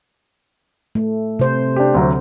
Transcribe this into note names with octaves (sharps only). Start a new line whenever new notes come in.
A3
C3 C5
D4 G4
D2 F#3